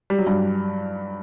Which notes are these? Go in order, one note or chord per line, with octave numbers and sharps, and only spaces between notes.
G3
F#3
G2 G3